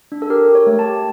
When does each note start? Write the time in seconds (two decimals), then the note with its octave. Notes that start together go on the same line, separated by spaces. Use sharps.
0.12 D4
0.22 A4
0.30 G4 A#4
0.49 G4
0.55 C#5
0.67 A3
0.79 A5
0.85 G4